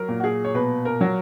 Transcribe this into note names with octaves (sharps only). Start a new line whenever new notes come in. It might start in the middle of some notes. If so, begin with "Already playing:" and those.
Already playing: F#3 A#4
A#2
F#4
G#4
C#5
B2 B4
A#4
F#3